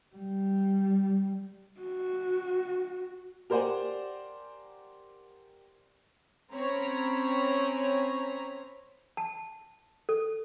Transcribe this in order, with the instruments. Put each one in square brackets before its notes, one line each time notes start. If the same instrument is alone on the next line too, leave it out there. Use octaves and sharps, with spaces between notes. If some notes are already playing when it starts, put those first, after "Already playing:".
[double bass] G3
[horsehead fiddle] F#4
[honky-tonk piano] G4 A#4 C5 D5 F#5 G#5
[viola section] C4 C#4 C#5 A#5 B5
[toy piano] A5
A4